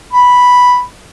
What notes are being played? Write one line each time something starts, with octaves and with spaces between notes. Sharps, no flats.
B5